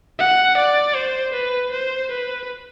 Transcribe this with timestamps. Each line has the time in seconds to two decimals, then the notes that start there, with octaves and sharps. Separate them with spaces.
0.19 F#5
0.57 D5
0.95 C5
1.34 B4
1.72 C5
2.11 B4